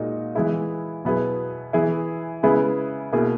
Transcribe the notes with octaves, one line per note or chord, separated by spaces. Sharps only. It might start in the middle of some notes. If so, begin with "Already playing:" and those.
Already playing: A#2 G#3 D#4 F#4
E3 G#3 B3 E4 G#4
B2 F#3 B3 E4 G#4
E3 B3 E4 G#4
C#3 G#3 B3 E4 G#4
B2 A#3 E4 G#4